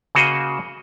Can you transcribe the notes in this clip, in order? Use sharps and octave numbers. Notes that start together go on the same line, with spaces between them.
C#3 A#3 F#4 C5 D#5